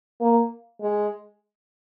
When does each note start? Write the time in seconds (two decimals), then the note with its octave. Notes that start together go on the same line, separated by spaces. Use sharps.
0.21 A#3
0.81 G#3